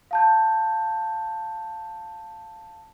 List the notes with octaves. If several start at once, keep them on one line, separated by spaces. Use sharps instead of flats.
F5 A5 G6